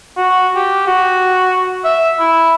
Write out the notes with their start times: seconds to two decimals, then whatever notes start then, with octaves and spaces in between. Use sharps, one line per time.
0.17 F#4
0.55 G4
0.87 F#4
1.84 E5
2.20 E4